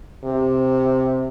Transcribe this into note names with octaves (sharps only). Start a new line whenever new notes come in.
C3